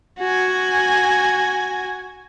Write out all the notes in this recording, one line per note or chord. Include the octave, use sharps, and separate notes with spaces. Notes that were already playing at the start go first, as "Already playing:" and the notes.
F#4 G#5